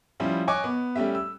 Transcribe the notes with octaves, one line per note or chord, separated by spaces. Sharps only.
F3 G3 C#4 E4 F4
C#5 D#5 G#5 C#6 D6 F#6
B3
G3 A3 C#4 G4 E5
E6